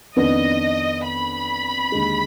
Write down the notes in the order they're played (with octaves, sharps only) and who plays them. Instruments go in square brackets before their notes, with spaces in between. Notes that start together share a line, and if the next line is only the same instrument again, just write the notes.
[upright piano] F2 D#3 B3 D4 [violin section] D#5
[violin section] B5
[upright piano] D#2 D3 G#3